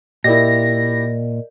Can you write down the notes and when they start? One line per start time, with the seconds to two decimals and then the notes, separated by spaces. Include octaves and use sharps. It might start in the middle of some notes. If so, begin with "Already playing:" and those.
0.24 A#2 E4 G4 A#4 D5 D#5 A#6